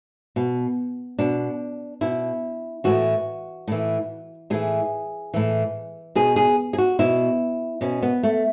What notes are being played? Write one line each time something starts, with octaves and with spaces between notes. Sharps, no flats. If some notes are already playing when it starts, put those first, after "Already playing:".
B2
B2 D4
B2 E4
A2 E3 F#4
A2 E3
A2 E3 G#4
A2 E3
B2 G#4
G#4
G#4
F#4
B2 E4
B2 C#4
B3
A3